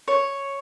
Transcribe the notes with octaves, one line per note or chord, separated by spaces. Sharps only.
C#5